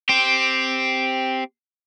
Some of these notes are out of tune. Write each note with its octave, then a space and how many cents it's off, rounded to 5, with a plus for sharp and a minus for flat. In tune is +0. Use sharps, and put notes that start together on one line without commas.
C4 +0 G4 +0